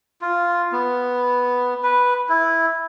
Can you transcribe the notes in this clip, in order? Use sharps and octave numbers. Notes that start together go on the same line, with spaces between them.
F4
B3
B4
E4